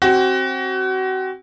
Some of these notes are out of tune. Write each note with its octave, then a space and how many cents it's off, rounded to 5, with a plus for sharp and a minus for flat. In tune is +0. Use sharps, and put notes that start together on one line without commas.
C4 +20 F#4 +30